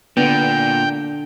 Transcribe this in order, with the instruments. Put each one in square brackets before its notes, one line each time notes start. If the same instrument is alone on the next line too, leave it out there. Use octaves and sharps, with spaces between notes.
[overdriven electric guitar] A#2 [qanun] D3 C6 [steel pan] B3 [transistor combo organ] G5